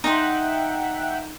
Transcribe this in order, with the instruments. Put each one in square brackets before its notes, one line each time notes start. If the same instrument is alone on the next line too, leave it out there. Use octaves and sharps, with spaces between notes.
[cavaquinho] D#4 C6 [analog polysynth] E5 F#5 G5